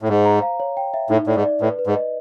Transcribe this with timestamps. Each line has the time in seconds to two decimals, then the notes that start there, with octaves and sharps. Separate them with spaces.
0.02 A2
0.09 G#2 C5
0.26 A#5
0.42 F5
0.60 C#5
0.77 G5
0.94 E5
1.10 A2 D#4
1.27 A2 D5
1.36 G#2
1.44 D5
1.61 A2 B4
1.79 B4
1.87 G#2
1.96 D#5